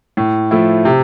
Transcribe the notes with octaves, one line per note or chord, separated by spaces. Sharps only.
A2
F3 A3 E4
C3